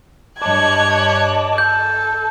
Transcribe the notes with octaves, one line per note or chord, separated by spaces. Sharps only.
G2 C#5 D#5 A5 D6 F#6 G#6
A4 G6